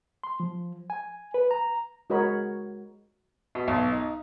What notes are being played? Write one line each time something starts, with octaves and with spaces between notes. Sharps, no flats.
C6
F3
G#5
B4
A#5
G#3 F#4 A#4 C#5 D#5 B5
B2
B1
D#4